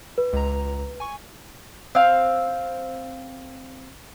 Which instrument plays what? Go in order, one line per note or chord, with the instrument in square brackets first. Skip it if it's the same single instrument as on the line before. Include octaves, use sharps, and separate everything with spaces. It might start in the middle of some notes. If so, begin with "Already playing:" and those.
[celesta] B4
[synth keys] C#2 A#5
G#5 C#6
[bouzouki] C4 F5